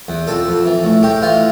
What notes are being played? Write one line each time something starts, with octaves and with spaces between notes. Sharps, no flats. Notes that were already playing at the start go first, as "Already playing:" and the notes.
E2
F2 A4
F2
E3
A2
A2 G4
E3 F4